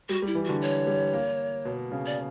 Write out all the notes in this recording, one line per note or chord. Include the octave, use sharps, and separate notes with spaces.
G3 F#4
G3
E4
E3
D3 F#4
C#5
G3
A#3
B2
C#3
D5